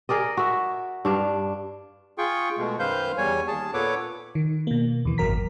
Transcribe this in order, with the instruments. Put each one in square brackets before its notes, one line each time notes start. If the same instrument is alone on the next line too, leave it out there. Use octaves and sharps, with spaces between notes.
[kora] G#4 A#4 D5 D#5
F#4 E5
G2 D4 F5
[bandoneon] F4 G#4 G5 C#6
B2 G#3 A3
F#2 D#3 B4 C5 F5 G6
E2 G3 C#5 G#5
D#2 G#4 A5
A#2 B3 A4 B4 C#5 D6
[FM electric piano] D#3
B2 A#3
D#2 E3
G#1 F#2 F#3 A#4 A#5 B6